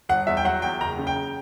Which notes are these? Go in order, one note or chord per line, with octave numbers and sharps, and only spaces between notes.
G1 F#5
E2 E5
G5
F#3 F#5
E2 G5
F#1 A#5
C#3
G5